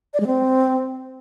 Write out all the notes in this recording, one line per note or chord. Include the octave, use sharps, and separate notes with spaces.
D5
G#3
C4